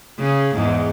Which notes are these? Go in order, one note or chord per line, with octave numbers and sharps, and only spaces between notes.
C#3
E2 G#2